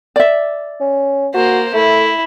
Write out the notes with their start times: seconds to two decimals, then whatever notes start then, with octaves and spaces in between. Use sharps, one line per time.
0.16 D5 E5
0.81 C#4
1.34 A#3 F#4 C5
1.74 A3 E4